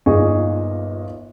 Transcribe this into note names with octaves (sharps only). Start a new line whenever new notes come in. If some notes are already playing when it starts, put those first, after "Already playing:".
G1 A#2 D#4 G#4 D#5 C#6